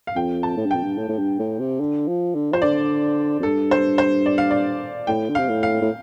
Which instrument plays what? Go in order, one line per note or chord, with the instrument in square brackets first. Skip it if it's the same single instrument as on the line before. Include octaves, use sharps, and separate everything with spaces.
[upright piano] F5
[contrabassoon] F2 [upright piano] G5
[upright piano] A5
[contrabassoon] A2
G2
[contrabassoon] F2 [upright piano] G5
[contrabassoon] G2
A2
A2
G2
A2
C3
D3
F3
D3
[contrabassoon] F3 [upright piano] C5
[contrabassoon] D3 [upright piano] D5
[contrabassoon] F2
[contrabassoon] G2 [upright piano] A4
[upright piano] C5
C5
D5
F5
D5
[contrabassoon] A2 [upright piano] G5
[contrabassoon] D3
[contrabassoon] C3 [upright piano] F5
[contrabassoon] A2
[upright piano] F5
[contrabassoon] A2